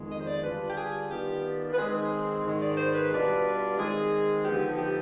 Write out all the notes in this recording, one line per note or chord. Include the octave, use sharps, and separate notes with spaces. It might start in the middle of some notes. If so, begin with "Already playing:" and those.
Already playing: F2 D#3 G#3 B3
D#5
C5
D5
D3 G3 D4 F4 B4
G4
G#4
D#3 B3 D4 F4 G4
B4
D#3 G#3 C4 D#4 G#4
G#2 D#3 G#3
D5
C5
B4
B2 G3 D4 F4
D#3 G#3 C4 G#4
D3 F3 B3 D#4 G4
G4